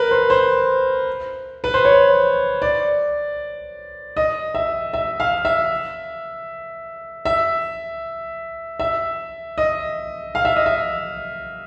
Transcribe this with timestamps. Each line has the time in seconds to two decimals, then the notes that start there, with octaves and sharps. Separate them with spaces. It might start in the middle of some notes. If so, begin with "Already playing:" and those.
Already playing: A#4 B4
0.11 C5
0.30 C5
1.64 B4
1.74 C5
1.85 C#5
2.62 D5
4.17 D#5
4.55 E5
4.94 E5
5.20 F5
5.45 E5
7.25 E5
8.80 E5
9.58 D#5
10.35 F5
10.45 E5
10.56 D#5
10.66 E5